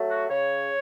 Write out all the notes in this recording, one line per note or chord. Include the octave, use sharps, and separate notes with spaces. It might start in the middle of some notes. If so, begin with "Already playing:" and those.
Already playing: F#3 A3
F#4
C#3 C#5